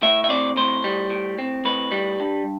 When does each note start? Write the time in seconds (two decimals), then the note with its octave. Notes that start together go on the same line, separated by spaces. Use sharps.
0.02 A2 E5
0.24 E5
0.29 C4 D5
0.57 A2 C5
0.84 G3
1.10 A2
1.38 C4
1.65 A2 B4
1.92 G3
2.20 G2